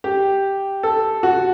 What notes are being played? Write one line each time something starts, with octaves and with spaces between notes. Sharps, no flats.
G4
A4
F#4